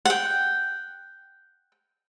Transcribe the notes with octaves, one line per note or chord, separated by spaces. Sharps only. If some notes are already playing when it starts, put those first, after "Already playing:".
F#5 G5